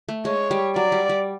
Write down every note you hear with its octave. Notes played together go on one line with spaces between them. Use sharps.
A3
G#3 C#5
G3
F#3 D5
G3
G3